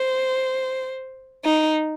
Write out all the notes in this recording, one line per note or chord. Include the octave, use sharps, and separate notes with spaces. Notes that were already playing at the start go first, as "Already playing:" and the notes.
Already playing: C5
D#4